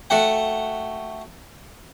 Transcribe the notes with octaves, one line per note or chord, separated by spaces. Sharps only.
A3 F#4 F#5 G5